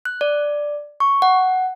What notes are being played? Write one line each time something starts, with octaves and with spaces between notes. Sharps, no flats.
F#6
D5
C#6
F#5